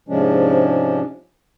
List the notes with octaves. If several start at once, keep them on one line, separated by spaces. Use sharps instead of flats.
G#2 C3 F3 G#3 C#4 D4